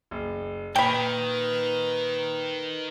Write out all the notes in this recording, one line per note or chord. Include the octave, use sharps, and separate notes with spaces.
F#1
A#2 D#3 B4 G5 B5